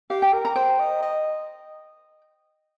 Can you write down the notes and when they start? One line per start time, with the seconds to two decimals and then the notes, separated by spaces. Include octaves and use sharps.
0.10 G4 F5
0.22 G5
0.33 A#4
0.45 A#5
0.56 C5 G5
0.79 D#5
1.02 D#5